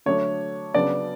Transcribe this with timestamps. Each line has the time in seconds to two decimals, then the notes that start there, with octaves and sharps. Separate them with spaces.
0.06 D3 F#3 A3 D4 A4 C#5
0.74 C#3 F#3 B3 D4 D5